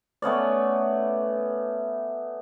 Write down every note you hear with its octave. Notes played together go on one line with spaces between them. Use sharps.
A3 B3 C#4 D5